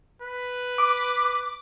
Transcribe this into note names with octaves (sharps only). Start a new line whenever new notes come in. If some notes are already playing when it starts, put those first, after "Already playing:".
B4
D6